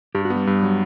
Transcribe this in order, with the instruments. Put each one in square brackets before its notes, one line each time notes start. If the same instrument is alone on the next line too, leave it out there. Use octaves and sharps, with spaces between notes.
[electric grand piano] G2 [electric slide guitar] G4
[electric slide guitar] F#4
[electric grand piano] B3
[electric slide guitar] G3 G4
[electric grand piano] G2
F#3